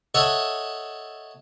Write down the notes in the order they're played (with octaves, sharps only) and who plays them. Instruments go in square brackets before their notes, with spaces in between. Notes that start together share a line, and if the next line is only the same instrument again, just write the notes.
[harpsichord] A4 C#5 D#5 E5 F#5